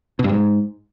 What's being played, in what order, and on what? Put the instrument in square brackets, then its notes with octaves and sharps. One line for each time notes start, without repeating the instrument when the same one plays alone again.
[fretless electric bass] B2
G2
G#2